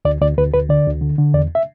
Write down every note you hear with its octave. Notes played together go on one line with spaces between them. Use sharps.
D2 D5
D2 D5
D2 B4
D2 B4
D3 D5
D2
D3
D3
E2 D5
E5